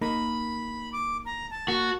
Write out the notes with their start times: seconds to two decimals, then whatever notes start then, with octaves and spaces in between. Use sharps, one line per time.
0.01 A#3 D#4 A#4 B5
0.93 D6
1.25 A#5
1.51 A5
1.68 A#3 F#4